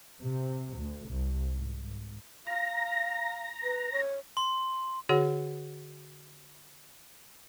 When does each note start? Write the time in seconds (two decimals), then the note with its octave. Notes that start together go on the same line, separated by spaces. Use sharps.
0.20 C3
0.76 D2
1.08 C2
1.54 G#2
1.83 G#1
2.47 F5 A#5
3.63 B4
3.92 C#5
4.37 C6
5.09 D3 F#4 G#4 C#5 F#5